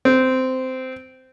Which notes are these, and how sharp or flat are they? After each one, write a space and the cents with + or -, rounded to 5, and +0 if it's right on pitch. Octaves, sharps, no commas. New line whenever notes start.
C4 -15